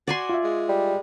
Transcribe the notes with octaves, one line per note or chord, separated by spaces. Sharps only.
F#4 D5 G#5 C6
F4 E5
G#3
G3